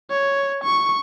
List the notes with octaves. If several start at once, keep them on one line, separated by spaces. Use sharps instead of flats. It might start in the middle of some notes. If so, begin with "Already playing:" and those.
C#5
C#6